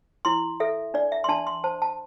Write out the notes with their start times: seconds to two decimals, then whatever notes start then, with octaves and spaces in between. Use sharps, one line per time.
0.25 E4 C6
0.60 A4 E5
0.94 D4 D5
1.12 E5
1.24 C6
1.29 D4 A5
1.47 C6
1.64 C5 A5
1.82 A5